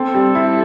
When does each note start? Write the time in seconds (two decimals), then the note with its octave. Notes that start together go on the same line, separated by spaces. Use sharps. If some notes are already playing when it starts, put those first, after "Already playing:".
Already playing: C4 A4
0.15 G3
0.35 E4